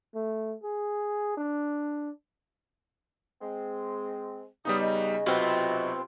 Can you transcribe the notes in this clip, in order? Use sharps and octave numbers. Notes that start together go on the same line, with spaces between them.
A3
G#4
D4
G#3 C4
C#3 G3 B3 D#4 D#6
D#5
B1 C3 B3 C4 F4 F#4